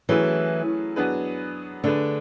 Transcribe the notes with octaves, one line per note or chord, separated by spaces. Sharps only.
E3 F#3 A3 C#4 G#4 B4
F#3 B3 D4 G#4 B4
D3 A3 D4 G#4 B4